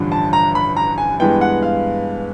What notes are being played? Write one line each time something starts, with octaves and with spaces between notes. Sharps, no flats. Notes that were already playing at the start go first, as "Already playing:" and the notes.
Already playing: A1 G2 D3 F3
A5
A#5
B5
A#5
G#5
G2 E3 G#3 B3 G5
F#5
F5